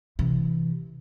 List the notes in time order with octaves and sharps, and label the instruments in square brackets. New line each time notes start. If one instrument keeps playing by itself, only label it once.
[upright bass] C3 E3